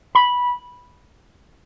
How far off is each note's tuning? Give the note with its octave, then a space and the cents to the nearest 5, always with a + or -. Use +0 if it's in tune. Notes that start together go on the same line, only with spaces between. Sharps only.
B5 -10